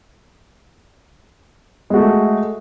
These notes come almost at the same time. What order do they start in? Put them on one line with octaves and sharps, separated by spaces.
G#3 F#4 A3